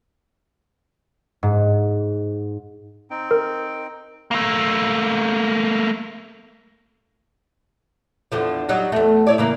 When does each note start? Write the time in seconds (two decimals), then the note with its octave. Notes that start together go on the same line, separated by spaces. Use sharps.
1.43 G#2
3.11 C4 D#4 G5
3.31 A#4
4.31 A3 A#3
8.32 E2 D3 F3
8.69 F#3 G3 D#4
8.92 E2 A3
9.27 E4 C#5 D5
9.38 C#3 E3 A#3